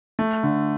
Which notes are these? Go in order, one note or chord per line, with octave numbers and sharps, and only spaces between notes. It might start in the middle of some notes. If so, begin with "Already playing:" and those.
A3
D3